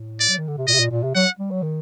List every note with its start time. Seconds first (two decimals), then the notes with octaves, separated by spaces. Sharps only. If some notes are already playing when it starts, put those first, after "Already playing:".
Already playing: A2
0.20 D5
0.29 F#3
0.38 D#3
0.48 D3
0.57 C3
0.67 A#2 D#5
0.74 C3
0.80 A#2
0.91 A#2
1.03 C3
1.15 F#3 F#5
1.39 G3
1.51 F#3
1.62 D#3